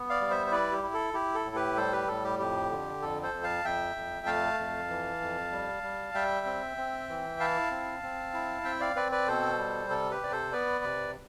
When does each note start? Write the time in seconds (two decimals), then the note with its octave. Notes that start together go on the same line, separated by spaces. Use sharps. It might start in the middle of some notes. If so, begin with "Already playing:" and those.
Already playing: B3
0.10 D5 F5
0.21 G3
0.30 C5 E5
0.47 C5
0.51 E4 B4 D5
0.72 G4
0.83 E4
0.94 A4
1.14 E4 G4
1.35 A4
1.45 A2
1.55 G4 B4
1.77 G3 A4 C5
1.92 G4 B4
2.07 A2 A4
2.24 G4
2.39 F2 G4
2.70 D3
3.02 F2 A4
3.22 A4 C5
3.33 F2
3.43 F5 A5
3.65 F2 E5 G5
3.96 F2
4.26 A3 F5 A5
4.59 F2
4.89 E3
5.21 F2
5.52 G3
5.83 G3
6.14 G3 E5 G5
6.46 C4
6.77 C4
7.09 E3
7.40 E4 F5 A5
7.71 C4
8.03 C4
8.34 E4
8.65 C4 E5 G5
8.80 D5 F5
8.96 C4 B4 D5
9.12 B4 D5
9.28 B2 A4 C5
9.58 G3
9.90 C3 A4
10.11 G4 B4
10.21 C3 D5
10.32 A4 C5
10.52 B3 B4 D5
10.84 C3